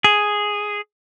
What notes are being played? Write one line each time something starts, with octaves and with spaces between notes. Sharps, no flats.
G#4